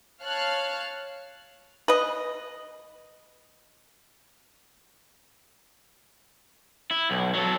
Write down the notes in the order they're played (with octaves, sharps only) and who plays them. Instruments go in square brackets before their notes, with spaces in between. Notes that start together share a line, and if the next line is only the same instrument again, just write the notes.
[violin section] C#5 F5 A5 F6 F#6
[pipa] B4 D#5
[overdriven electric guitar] E4
B1
F#3 A4